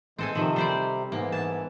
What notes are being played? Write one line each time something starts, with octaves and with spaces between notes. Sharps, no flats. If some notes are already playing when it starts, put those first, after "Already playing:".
E3 G#3 C4 A4 G#5
C3 D#3 F3
G3 C5 D5
G#2 E3 A#3 B3
A5